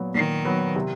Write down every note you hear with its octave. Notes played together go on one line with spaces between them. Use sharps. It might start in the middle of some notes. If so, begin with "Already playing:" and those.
Already playing: A#2 F#3 B3
A#2 D#3
F#3 B3
C3